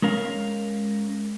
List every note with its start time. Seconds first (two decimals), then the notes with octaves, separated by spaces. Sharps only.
0.02 G#3 C#4 A#4 F5